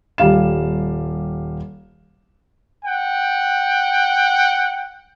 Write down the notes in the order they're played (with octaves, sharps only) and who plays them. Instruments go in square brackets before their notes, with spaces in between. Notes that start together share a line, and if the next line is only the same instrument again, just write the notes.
[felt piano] D#1 G3 F5 E7
[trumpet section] F#5 G5